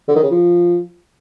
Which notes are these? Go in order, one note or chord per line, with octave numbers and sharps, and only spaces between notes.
D3
D#3
C#3
F3